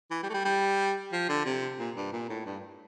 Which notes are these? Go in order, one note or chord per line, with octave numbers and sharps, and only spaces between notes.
E3
G3
A3
G3
G3
F3
D3
C3
A#2
G2
A#2
A2
G2